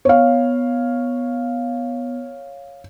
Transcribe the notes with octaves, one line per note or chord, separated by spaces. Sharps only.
B3 C#5 F5